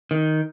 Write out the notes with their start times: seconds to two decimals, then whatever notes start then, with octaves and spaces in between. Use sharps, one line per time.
0.11 D#3